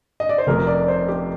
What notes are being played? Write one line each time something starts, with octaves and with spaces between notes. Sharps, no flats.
D#5
D5
C5
F1 F2 C3 A#4
D5
C5
G4